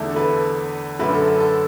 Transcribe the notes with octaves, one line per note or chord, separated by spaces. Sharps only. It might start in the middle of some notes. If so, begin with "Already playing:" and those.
Already playing: E2 D3 A3
A4
B4
F#2 D3 A3 B4
A4
B4
A4